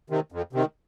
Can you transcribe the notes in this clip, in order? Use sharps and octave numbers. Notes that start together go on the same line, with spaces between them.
C3 D#3
F2
C3 D#3